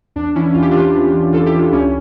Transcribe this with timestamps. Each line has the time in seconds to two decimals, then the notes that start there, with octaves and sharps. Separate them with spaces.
0.16 E2 D4
0.35 E3 C#4 E4
0.54 E2 F4
0.62 G4
0.71 E3 D4 F4
0.94 E2
1.13 E3
1.33 E2 F4 A4
1.46 E4 G4
1.53 E3
1.59 D4 F4
1.72 C#2 C#4 E4